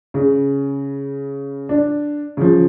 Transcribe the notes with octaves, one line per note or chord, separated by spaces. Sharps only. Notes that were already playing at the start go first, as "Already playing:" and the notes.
C#3
D4
C#3 F3